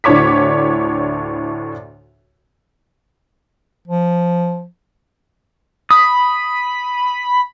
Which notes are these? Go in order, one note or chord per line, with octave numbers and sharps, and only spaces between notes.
D2 A2 D4 C#5 D6 B6
F3
B5 D#6